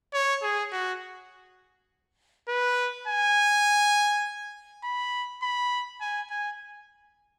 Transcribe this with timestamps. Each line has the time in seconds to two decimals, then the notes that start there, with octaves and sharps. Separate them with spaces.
0.14 C#5
0.43 G#4
0.72 F#4
2.48 B4
3.08 G#5
4.84 B5
5.42 B5
6.01 G#5
6.30 G#5